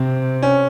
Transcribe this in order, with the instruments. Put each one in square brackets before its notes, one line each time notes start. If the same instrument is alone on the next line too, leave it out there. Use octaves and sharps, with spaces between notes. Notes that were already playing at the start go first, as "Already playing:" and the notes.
Already playing: [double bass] C3 [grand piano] C4
[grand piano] C#4